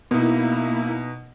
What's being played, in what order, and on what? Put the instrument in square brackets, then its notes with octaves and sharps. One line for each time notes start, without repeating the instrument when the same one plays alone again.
[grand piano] B2 D#4 [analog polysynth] A#3 E4